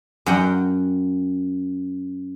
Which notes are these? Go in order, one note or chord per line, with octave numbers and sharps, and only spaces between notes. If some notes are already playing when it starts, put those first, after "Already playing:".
F#2 F#5 G5